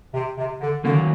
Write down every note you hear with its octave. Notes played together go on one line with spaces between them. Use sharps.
C3
C3
D3
D3 D#3 F#3 A#3 C#4